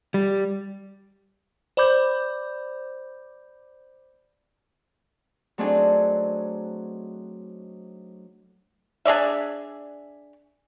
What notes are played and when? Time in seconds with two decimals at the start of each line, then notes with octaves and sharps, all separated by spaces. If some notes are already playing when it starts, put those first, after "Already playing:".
0.14 G3
1.77 C5 D5 B5 D6 G6
5.58 F#3 A3 C4 D4 D#4 G#4
9.05 D4 G#4 D5 E5